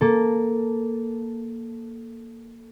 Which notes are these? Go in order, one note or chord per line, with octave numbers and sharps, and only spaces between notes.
A#3 A4